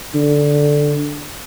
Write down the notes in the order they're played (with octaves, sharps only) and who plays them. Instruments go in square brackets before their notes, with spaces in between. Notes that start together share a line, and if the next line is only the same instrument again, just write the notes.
[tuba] D3